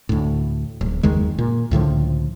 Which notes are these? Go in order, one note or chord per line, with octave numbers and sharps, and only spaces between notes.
D2 A2
D1
F#1 D#2 D#3 G#3
A#2
C#2 A2 D3 F3